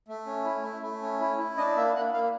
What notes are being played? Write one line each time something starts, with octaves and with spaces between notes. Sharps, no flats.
A3
C#4
E4
A3
A3
C#4
E4
E4
D4 D#5
A#3 E5
A#3 F#5
A#3 F5